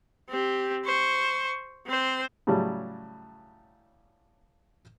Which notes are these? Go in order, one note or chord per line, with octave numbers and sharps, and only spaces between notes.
C4 G4
C5 C#6
C4 C5
A2 C#3 F#3 G3